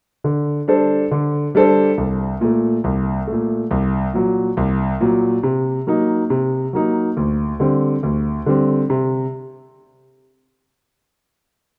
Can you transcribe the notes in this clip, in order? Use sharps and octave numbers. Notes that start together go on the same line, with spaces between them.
D3
G3 D4 A4 C5
D3
G3 D4 A4 C5
C2
A#2 A3
C2
A#2 A3
C2
A#2 F#3
C2
A#2 F#3
C3
F#3 A#3 D#4
C3
F#3 A#3 D#4
D2
D3 G3 C4
D2
D3 G3 C4
C3